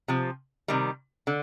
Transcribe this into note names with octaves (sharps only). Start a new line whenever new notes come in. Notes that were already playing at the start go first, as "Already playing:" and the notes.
C3 F3
C3 D#3 G3
D3